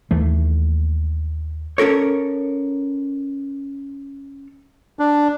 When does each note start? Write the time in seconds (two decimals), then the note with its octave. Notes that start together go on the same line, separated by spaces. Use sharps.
0.11 D#2 E3 A3
1.78 C#4 A4 A#4 C#5
4.99 D4